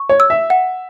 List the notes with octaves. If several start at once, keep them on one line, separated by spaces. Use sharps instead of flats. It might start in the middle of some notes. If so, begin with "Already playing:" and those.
Already playing: C#6
C#5
E6
E5
F#5